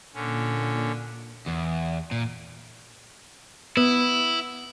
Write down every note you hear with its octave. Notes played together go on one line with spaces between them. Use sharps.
A#2 D3 C#4
E2
A#2
B3 E4